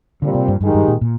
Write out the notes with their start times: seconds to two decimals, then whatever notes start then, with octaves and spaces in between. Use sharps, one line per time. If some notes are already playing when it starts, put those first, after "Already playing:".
0.22 A#2 D3 G3 C4
0.34 C3
0.48 G2
0.61 G2 D#3 G#3 D#4 G4
0.74 G2
0.88 A#2
1.01 A#2